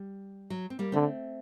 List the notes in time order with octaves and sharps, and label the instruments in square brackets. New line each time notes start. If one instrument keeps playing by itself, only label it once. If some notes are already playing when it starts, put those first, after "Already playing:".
Already playing: [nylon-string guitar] G3
F#3
C4
G3 A#3
[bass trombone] D3 [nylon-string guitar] A3 C4